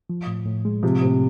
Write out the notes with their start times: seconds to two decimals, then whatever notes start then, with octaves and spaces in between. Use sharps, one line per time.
0.10 F3
0.27 A2
0.46 A2
0.65 G#3
0.83 C3 F3
1.01 A2 C3